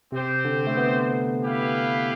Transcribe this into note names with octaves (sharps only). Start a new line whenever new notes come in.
C3 C4 G4 C5
D3
A3
B3
E4 G4 B4 F5